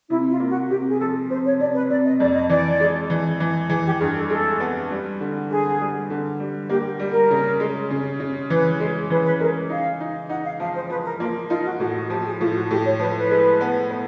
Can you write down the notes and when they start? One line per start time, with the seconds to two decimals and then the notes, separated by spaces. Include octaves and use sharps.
0.10 C3 E4
0.30 F4
0.40 A#3
0.50 F#4
0.69 C3 G4
0.89 G#4
1.00 F3 A4
1.30 C3 C5
1.45 C#5
1.59 C3 D5
1.75 B4
1.90 C3 D5
2.06 D#5
2.20 F2 D5
2.35 D#5
2.49 E3 D5
2.80 G#3
3.10 E3
3.40 E3
3.69 E3 G#4
3.85 G4
4.00 G2 G#4
4.15 A4
4.30 G#3 A4
4.60 B3
4.91 G3
5.20 D3
5.50 D3 G#4
5.81 G3
6.10 D3
6.40 G3
6.69 A#3 G4
7.00 G3
7.11 A#4
7.31 C#3
7.60 G#3
7.90 C#3
8.20 C#3
8.50 E3 B4
8.80 G#3
9.10 E3 B4
9.25 B4
9.40 G#3 A#4
9.69 D#4 F5
10.00 D#4
10.29 D#4 F#5
10.45 F5
10.60 F3 F5
10.75 C5
10.90 F3 B4
11.05 A#4
11.20 A#3 F4
11.50 D#4 F4
11.64 F#4
11.80 A2 F#4
11.95 F#4
12.10 F3 G4
12.26 G#4
12.40 A2 F4
12.55 F#4
12.71 A2 G4
12.85 C#5
12.99 F3 B4
13.15 B4
13.31 G#3
13.61 B3
13.91 B3